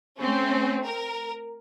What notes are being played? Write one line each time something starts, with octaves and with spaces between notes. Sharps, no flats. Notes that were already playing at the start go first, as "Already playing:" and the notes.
A3 C4 C#4
A#4